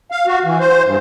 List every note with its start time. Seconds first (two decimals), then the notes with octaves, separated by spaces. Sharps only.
0.11 F5
0.27 F#4
0.45 E3
0.60 C5
0.85 G2